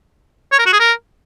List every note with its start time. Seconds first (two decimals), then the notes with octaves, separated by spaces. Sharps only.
0.52 C#5
0.59 A#4
0.66 F#4
0.73 G#4
0.80 A#4